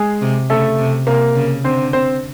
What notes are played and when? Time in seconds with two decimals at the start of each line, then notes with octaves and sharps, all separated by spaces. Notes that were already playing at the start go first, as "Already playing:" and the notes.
Already playing: G#3 G#4
0.22 C3
0.50 C#3 A3 A4
0.79 C3
1.07 C3 A#3 A#4
1.36 C#3
1.64 D3 C4 C5
1.93 C4 C5